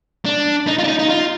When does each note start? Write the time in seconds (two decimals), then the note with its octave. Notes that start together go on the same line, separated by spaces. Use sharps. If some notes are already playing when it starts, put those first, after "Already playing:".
0.25 D4
0.67 D#4
0.78 F4
0.84 D4
0.88 D#4
0.99 D#4
1.09 F4